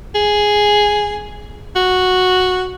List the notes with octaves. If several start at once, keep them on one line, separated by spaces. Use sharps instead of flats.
G#4
F#4